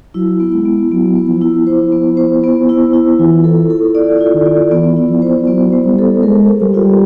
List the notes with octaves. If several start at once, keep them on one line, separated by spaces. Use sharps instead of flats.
F#3 E4
B3
G#3
B3
F#3 B3
B3
F3
E4
C5
B3
C5
B3
E4
E4
E3 F4
A4
A4
D5
F4
D#3
D5
E3 B3
E4
F3
C5
F#3 B3
C5
G3
A4
G#3 A#4
A#4
G3
F4